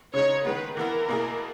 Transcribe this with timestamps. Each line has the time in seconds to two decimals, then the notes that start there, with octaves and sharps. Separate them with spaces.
0.14 C#3 G#3 D#4 C#5
0.45 D#3 G#3 B3 B4
0.76 E3 B3 E4 A#4
1.08 B2 A#3 E4 G#4